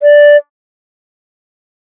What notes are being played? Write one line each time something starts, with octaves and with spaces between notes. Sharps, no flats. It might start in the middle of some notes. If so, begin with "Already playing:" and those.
D5